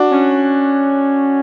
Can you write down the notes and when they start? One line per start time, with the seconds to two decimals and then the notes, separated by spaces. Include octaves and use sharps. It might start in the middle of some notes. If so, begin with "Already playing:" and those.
Already playing: D4 F#4
0.11 C#4